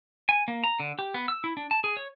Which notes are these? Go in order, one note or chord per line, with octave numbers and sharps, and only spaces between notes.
G#5
A#3
A#5
D3
G4
B3
E6
E4
D4
A5
G#4
C#5